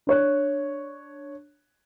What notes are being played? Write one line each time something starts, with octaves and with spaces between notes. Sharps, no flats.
D4 C#5 F#6